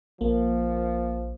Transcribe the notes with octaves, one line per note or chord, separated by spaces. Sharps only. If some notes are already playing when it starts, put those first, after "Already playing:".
A#1 F3 A#3